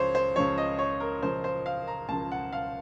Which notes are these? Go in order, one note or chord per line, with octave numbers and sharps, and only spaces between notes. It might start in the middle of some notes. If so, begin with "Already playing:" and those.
Already playing: C#2 C#3 F3 C5 C#5
C5
C#2 C#3 F3 C#5
D#5
C#5
A#4
C#2 C#3 F3 C5
C5
F5
A#5
C#2 C#3 F3 A5
F#5
F5